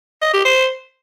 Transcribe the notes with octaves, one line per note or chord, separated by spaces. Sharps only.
D#5
G4
C5